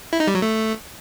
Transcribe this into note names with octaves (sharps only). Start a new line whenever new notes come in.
E4
D#4
G3
F#3
A3